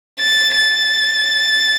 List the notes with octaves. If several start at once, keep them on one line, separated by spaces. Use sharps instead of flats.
A6
A6